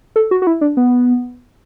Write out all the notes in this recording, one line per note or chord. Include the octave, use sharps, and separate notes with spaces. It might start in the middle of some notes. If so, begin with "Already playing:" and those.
A4
F#4
F#4
E4
D4
B3